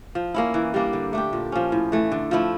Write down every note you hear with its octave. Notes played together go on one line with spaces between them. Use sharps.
F3
A#3 C#4 E4
E3
G3 A#3 D4
D3
A3 D4 G4
A#2
F3 C#4
A2
E3 A3
D3
F3 A3 E4